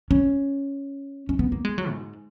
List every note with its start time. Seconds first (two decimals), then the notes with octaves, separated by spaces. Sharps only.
0.11 C#4
1.29 C#4
1.39 B3
1.52 A#3
1.65 G#3
1.78 F#3
1.90 G#2